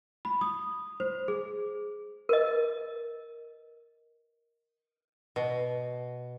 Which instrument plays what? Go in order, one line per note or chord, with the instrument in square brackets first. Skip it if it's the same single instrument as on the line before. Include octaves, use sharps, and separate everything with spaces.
[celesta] B5
D#6
C5
G#4
[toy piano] A#4 B4 D#5
[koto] B2